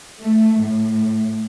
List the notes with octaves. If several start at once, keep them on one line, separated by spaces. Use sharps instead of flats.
A3
A2